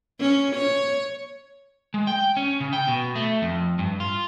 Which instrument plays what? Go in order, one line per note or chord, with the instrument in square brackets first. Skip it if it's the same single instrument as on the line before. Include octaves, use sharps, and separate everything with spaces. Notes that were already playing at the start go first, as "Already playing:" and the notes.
[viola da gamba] C#4
C#5
[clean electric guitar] G#3
G5
C#4
C#3
G5
B2
A3
F2
G2
F4